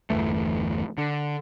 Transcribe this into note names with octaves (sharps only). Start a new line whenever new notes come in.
G1 E2 E3 A3
D3